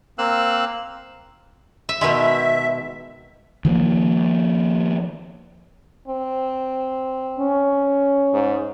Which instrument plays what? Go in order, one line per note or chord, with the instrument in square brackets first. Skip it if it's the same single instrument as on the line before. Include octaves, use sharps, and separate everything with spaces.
[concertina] A#3 C4 F5 E6 F#6
[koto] E5
[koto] B2 D#3 G#3 [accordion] E5
[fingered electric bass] D#3 F3 A3 A#3
[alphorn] C4
[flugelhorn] C#4
[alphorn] G#2